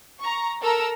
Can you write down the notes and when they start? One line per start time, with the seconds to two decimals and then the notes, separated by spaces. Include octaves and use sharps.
0.21 A#5 C#6
0.61 A4 A#4 A#5 E6